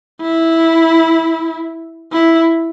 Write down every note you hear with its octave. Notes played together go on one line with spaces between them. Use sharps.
E4
E4